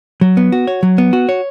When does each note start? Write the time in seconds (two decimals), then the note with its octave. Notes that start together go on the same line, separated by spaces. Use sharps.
0.21 F#3
0.37 B3
0.52 F#4
0.67 C#5
0.83 F#3
0.98 B3
1.13 F#4
1.29 C#5